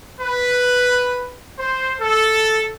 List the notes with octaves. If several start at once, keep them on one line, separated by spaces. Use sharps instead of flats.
B4
C5
A4